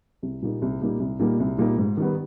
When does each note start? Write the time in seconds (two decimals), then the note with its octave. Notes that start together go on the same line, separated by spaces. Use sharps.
0.23 C2
0.42 A#2 G3 A#3 D#4
0.62 C2
0.81 A#2 G3 A#3 D#4
1.00 C2
1.19 A#2 G3 A#3 D#4
1.40 C2
1.58 A#2 G3 A#3 D#4
1.78 G#2
1.97 D#3 G3 B3